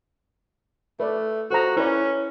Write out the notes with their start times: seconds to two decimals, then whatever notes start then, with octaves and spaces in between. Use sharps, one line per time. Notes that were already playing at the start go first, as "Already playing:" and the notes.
1.00 A3 B4 D5
1.51 F#4 A4 C5 A#5
1.77 C#4 E4 B4 D5